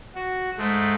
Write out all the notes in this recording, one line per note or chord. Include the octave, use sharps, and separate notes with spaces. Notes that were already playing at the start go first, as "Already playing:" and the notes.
F#4
G#2 G#3 A3